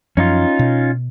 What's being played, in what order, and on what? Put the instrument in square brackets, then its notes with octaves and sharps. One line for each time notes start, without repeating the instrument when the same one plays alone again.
[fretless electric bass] F#2 F3 F#3 [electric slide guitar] C#4 D#4 F4
[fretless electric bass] B2